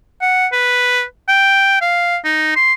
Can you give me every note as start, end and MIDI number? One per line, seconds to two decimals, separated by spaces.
0.21 0.47 78
0.52 1.03 71
1.28 1.76 79
1.81 2.17 77
2.24 2.54 63
2.56 2.73 84